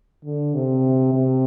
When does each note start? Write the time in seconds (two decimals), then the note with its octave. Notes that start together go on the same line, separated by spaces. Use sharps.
0.25 D3
0.54 C3
1.13 C3